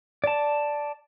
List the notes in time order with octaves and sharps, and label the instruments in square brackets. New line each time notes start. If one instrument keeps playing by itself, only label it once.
[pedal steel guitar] D5 A5